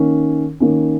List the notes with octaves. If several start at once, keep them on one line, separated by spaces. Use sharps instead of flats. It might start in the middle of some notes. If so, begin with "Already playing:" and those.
Already playing: D#3 A#3 C#4
D#3 A#3 C#4